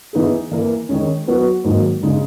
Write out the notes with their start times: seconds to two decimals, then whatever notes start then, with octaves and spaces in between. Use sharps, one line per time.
0.13 E3 B3 D#4 G#4
0.51 E3 A#3 E4 A#4
0.89 D#3 G#3 C#4
1.27 F#3 B3 F#4 B4
1.64 G#2 D#3 F#3 A#3 D#4
2.03 C#3 G#3 D#4